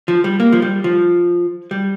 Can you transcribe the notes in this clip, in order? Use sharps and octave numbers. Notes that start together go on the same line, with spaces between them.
F3
G3
A#3
F3
G3
F3
G3